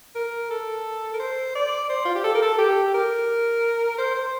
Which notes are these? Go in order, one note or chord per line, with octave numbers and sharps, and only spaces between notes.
A#4
A4
A#4
C5
D5
C5
F4
G4
A4
A#4
A4
G4
A#4
C5
C5